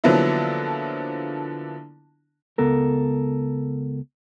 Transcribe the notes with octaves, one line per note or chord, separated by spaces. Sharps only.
D3 F3 F#3 A#3 B3 E4
C#2 B3 A4 A#4